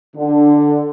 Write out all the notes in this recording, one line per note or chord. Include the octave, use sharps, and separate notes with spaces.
D3